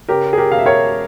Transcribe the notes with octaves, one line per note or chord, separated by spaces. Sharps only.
C#3 G4 A#4
G#4
G4 A#4
E1 F5
E5
A#4 C#5